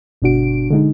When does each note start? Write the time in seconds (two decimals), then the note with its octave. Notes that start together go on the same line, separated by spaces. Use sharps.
0.22 G1 B2 D4 F#4 D7
0.70 D3 G#3 D#4